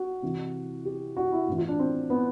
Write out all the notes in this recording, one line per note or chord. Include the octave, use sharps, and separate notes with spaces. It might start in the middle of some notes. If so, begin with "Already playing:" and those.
Already playing: F#4
C3 E3
G4
F#4
E4
A2 E3
F4
D4
C4
B3